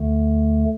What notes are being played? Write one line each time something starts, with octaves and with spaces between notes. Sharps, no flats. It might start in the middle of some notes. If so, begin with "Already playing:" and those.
Already playing: D2 D3 A3